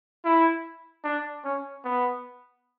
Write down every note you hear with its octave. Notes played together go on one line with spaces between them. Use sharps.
E4
D4
C#4
B3